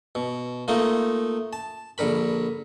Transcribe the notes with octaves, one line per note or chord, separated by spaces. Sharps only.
B2
A3 A#3 D#4 F4
A5
A#1 D3 A#4 B5